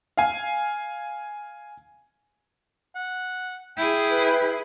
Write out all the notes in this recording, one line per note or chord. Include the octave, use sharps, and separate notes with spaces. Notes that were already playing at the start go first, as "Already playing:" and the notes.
F5 G#5
F#5
E4 G#4 G5
B4